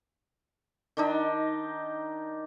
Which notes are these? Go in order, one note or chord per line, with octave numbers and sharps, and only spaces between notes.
D#3 D4 D#4